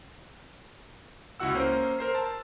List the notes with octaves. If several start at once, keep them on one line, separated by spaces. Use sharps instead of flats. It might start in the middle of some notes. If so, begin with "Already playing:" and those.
C#2 E4 F#4 F#5 E6
A#3 C#4 A#4 C5
A#4 C5 C7
A5